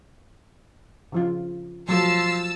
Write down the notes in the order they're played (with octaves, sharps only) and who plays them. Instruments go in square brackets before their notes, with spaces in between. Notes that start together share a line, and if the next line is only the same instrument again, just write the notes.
[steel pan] C#3 F3 F4
[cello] F3 [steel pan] F#3 A3 A4 [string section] A5 E6 [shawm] C6